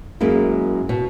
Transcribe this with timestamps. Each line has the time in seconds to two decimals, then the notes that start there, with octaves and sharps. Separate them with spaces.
0.21 F#2 G#3 A#3 E4
0.89 B2